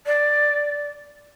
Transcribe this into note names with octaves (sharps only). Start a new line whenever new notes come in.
D5